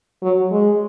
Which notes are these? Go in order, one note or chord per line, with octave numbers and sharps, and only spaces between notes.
F#3
G#3